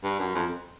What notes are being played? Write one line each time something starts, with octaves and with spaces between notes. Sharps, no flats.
G2
F#2
F2